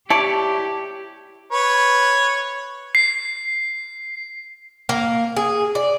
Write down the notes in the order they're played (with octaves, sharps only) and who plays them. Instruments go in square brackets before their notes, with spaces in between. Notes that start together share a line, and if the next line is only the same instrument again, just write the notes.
[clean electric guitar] E4 C#5 D5 [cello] G4 [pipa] A5
[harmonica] B4 C#5
[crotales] C7
[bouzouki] A#3
G#4
D5